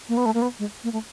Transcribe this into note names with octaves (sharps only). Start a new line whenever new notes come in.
A#3
B3
A3
A#3
B3
G#3
A#3
A3